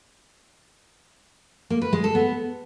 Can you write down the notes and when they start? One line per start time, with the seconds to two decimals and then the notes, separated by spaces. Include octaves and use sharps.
1.70 A#3
1.82 B4
1.93 G#3
2.04 A4
2.15 B3